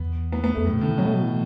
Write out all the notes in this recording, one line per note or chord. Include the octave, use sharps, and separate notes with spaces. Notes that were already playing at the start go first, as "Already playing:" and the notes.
Already playing: E2 B3
B3
B3
E2 A3
F#2 A2
B2
A2 D3
E3
B2 F#3
A3
F#3
E3